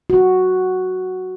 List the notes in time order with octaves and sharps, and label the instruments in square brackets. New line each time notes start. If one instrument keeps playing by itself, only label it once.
[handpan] F#4